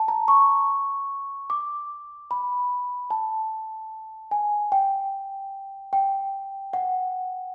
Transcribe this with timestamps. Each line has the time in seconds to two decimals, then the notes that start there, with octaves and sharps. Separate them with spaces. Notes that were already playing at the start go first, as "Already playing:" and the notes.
Already playing: A5
0.08 A#5
0.28 C#6
1.50 D6
2.31 B5
3.11 A5
4.31 G#5
4.72 G5
5.93 G5
6.73 F#5